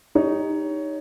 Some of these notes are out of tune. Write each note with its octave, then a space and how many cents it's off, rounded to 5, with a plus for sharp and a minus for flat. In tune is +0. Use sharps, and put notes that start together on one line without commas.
D#4 +0 G4 +15 C#5 +15